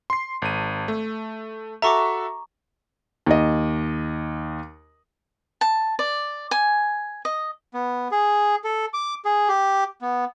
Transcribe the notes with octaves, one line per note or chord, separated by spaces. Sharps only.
C6 C7
G#1 D#7
A3
F#4 A4 E5 A#5 C#6 D6
D#2 D#5
A5
D5
G#5
D#5
B3
G#4
A4
D6
G#4
G4
B3